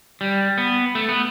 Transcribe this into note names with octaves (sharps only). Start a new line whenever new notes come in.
G3
B3
A3
B3